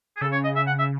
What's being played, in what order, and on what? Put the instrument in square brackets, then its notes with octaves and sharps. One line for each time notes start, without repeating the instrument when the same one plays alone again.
[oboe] G#4
[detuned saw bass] C#3 [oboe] A4
[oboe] C#5
D#5
E5
F#5
E5